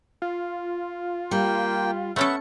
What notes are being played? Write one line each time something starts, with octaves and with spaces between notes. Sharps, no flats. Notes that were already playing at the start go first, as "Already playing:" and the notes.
F4
G3 A#3 G5
F#3 A3 B3 C#4 A4 E5 F#5 C#7